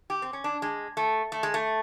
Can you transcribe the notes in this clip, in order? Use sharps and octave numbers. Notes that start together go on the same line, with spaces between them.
G4
C4
C#4
D4
G#3
A3
A3
G#3
A3